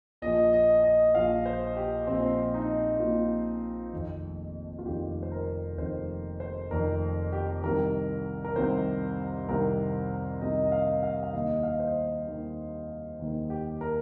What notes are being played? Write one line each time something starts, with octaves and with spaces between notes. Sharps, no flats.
A#1 A#2 F3 D#5
D#5
D#5
A#1 A#2 F3 F5
C5
G4
A#1 A#2 F3 C4
C4
D#4
A#1 A#2 F3 F4
F1 F2 D#3
F4
F1 F2 D#3 G4
C5
A#4
F1 F2 D#3 C5
C5
F1 F2 D#3 A#4
G4
C2 C3 D#3 A#4
A#4
C2 C3 D#3 C5
C2 C3 D#3 A#4
C2 C3 D#3 D#5
D#5
F5
F5
F5
D#2 D#3 D#5
F5
D#5
C5
D#2 D#3
D#2 D#3
G4
A#4